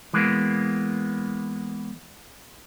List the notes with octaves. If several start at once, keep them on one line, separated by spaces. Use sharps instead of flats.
E3 G#3 A#3 B3